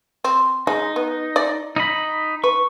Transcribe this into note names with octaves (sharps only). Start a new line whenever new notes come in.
C4
G#3 D#4
B3
D5
D#4 D#5 B5
B4 C#6